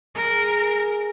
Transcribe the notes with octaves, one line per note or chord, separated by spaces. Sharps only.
G#3 A#4